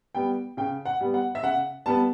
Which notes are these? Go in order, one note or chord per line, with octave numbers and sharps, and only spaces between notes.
G3 B3 G5
C#3 G5
F#5
G3 B3
F#5
E5
C#3 F#5
G3 B3 A5